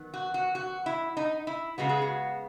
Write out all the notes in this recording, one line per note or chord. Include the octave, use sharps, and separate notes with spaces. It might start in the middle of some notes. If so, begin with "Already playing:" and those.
Already playing: D#3 F#3 B3
F#4
F#4
F#4
E4
D#4
E4
C#3 G#3 B3 F#4
G#4
F#4